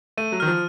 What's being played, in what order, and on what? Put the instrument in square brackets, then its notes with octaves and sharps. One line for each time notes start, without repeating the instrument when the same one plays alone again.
[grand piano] A3 [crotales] D#7
[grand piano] F#3
[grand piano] D#3 [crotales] F6
[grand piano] F3